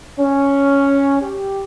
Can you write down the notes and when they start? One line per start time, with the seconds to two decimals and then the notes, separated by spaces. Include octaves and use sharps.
0.19 C#4
1.21 G4